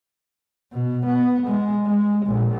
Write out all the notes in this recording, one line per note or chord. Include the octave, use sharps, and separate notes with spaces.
B2
B3
G#3
G#3
A#1